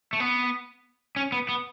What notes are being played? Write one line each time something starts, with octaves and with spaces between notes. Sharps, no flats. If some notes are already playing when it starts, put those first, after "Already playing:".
A3
B3
C#4
B3
B3